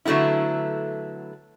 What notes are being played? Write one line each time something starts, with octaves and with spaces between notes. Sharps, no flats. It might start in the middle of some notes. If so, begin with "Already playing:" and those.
D3 F#3 A3 B3 E4